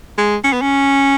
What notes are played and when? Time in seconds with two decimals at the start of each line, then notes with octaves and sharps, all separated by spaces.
0.18 G#3
0.44 C#4
0.53 B3
0.61 C#4